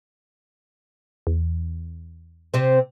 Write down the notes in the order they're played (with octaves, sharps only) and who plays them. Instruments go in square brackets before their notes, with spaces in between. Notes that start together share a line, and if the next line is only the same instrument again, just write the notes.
[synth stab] E2
[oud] C3 C4